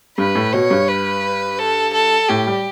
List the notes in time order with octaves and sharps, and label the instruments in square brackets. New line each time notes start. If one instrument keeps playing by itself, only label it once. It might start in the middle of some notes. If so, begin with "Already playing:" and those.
[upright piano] G2 [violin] B4
[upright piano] A2
[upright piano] B2 [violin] C#5
[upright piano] G2
[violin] B4
A4
A4
[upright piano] A2 [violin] G4
[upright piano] G3